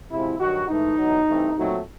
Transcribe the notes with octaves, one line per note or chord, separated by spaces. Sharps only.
C3 F3 G#3 C4 E4
G2 D#3 F#3 F#4
G#2 E3 A3 D#4
E2 B2 F#3
G2 E3 A3 C4
A#2 F#3 A3 C4